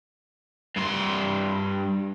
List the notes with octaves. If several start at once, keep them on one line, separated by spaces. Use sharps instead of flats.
G2 C6